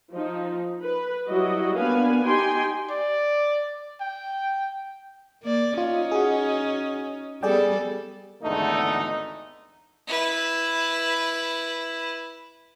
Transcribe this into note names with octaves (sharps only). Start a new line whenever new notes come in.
F3 D#4
B4
F#3 G3 E4 F#4 D#5
A#3 B3 D4 B4 F5 G#5
D#4 G4 G5 G#5 C6
D5
G5
A#3 D5
C#4 D#4 F4
F#4 G#4
G3 B3 G#4 A4 D5 G5
G#1 E2 D3 A3 D#4
E4 B4